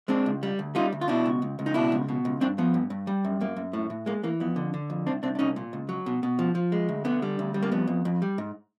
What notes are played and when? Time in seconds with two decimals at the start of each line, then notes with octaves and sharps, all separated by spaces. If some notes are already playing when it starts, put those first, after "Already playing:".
0.08 G#3 C4 D4
0.26 C#2
0.43 G3
0.59 D2
0.75 G3 D#4 F4
0.92 D2
1.01 F4
1.08 B2 D4 E4
1.26 C#2
1.42 C#2
1.59 C#2
1.66 D#4
1.74 B2 D4 E4
1.92 C#2
2.09 B2
2.25 C#2
2.41 G2 C4 D4
2.58 F3 B3
2.74 G2
2.90 G2
3.07 G3
3.25 F#2
3.41 F#2 A#3
3.56 F#2
3.73 A2
3.90 A2
4.06 G#3 A#3
4.23 E3 A#3
4.40 F2 B3
4.56 D3
4.74 D3
4.90 F2
5.07 C2 C4 D4
5.23 C2 C4 D4
5.35 D4
5.39 C2 C#4 D#4
5.56 A#2
5.73 C#2
5.89 F#3
6.06 B2
6.23 B2
6.39 F3
6.55 F3
6.72 G#3
6.89 D2
7.05 D3 B3
7.22 G3
7.39 D2
7.54 G3
7.63 A#3
7.72 F2 B3
7.87 F2
8.05 F2
8.22 G3
8.38 G#2